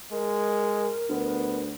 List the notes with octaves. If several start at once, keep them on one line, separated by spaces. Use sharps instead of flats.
G#3 A#4
D2 B3